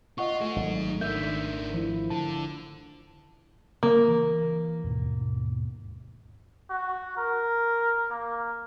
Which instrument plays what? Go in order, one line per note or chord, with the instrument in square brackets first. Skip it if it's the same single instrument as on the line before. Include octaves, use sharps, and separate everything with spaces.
[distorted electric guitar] F4 [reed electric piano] D#5 F#5 C#6
[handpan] A3 [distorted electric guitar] D#4 G#4
[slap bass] G#1 [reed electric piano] F#3
[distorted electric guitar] D#3 D4 [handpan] A#4 E5 [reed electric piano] G6
[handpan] F3 E4
[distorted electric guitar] D3 [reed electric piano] A5
[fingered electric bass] C#3 [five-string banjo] A#3
[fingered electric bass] E3
D#2 G#2 B2
[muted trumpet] F#4
A#4
A#3